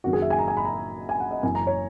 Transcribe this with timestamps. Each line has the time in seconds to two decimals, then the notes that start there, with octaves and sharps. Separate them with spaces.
0.04 F#1 F#2 D#3 F#4
0.13 G#4
0.22 E5
0.30 G#5
0.39 A#5
0.48 G#5
0.57 B5
0.65 A#5
1.09 G#5
1.20 F#5
1.31 D#5
1.43 F#1 F#2 C#3 E3 G#5
1.55 A#5
1.67 C#5